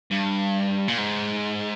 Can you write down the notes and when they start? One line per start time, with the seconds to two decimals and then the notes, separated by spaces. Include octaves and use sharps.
0.11 G2
0.88 A#2
0.98 G#2